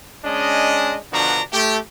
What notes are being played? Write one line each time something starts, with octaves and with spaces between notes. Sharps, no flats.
G#3 C#4 D4 D#5
B2 D3 F3 D4 F#4 A#5
A3 G4